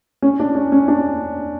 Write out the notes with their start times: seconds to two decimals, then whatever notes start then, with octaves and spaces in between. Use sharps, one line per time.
0.22 C#4
0.40 D4
0.55 C#4
0.72 C#4
0.88 D4